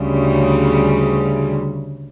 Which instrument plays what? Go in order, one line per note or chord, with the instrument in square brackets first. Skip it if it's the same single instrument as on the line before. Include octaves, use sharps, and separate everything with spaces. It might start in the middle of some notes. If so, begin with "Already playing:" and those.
Already playing: [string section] D2 C#3 G3